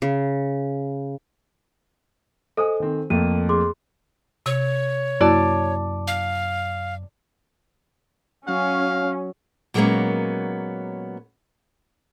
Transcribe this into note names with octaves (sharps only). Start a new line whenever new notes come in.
C#3
A4 C5 D#5 G#5 D#6
D#3 C4
F2 A3 A#3 D#7
G#4 C6 D6
C3 C#5
F#2 A#3 E4 F#4 D5 A5
F5
F#3 C#4 F5
A#2 F#3 G#3 A#3 B3 C#4